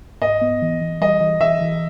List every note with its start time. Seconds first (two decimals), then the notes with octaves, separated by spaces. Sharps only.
0.22 G#2 D#5
0.42 B3
0.62 E3
0.81 E3
1.01 G3 D#5
1.20 E3
1.41 E3 E5
1.61 E3